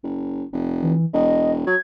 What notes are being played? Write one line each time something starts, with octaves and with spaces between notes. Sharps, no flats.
F#1
F1
E3
E1 D#5
F#3 G#6